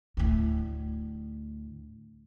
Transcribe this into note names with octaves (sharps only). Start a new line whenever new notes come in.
D2 A2